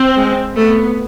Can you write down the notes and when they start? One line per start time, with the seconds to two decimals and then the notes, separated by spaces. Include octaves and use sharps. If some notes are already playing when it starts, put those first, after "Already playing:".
Already playing: C4
0.17 G#3
0.56 A3 B3